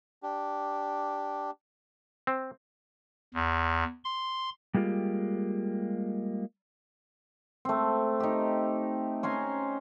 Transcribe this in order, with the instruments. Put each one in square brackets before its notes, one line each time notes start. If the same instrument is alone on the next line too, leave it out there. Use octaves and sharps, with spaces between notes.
[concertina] D4 G4
[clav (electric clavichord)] C4
[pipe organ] E2
C6
[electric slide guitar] G3 G#3 A#3 F4 G4
[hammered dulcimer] A3 C4
D#4 G4
C#4 C5 G#5 A#5